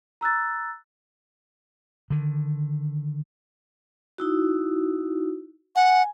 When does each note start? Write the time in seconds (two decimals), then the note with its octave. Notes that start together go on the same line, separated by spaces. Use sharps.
0.21 A#5 E6 F#6 A6
2.10 D3 D#3
4.18 D#4 E4 F#4
5.76 F#5 G#5